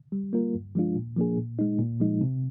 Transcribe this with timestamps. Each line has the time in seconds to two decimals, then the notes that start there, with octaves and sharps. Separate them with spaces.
0.12 G3
0.33 A#3 F4 A#4
0.54 G2
0.75 F3 G#3 D4 F4
0.96 A#2
1.16 F3 A#3 D4 G#4
1.37 A#2
1.59 G#3 D#4
1.79 A#2
2.00 F3 G#3 D#4
2.21 C3